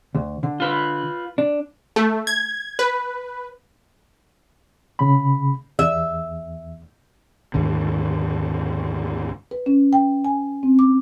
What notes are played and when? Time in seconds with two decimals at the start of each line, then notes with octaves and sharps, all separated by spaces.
0.15 D2
0.43 D3
0.60 F4 B4
1.38 D4
1.96 A3
2.27 G#6
2.79 B4
4.99 C#3 B5
5.79 E2 E5
7.54 D#2 G#2 D3
9.51 B4
9.66 C#4
9.93 G5
10.25 G#5
10.63 C4
10.79 D6